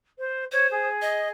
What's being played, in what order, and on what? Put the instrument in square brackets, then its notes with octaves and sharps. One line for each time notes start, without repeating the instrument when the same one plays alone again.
[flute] C5
[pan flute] C5 [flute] C#5
[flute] G#4
[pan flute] D#5